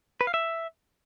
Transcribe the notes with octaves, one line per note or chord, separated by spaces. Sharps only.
B4
F5
E5